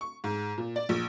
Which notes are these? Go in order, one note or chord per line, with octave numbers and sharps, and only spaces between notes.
C#6
G#2
A#2
D5
A#1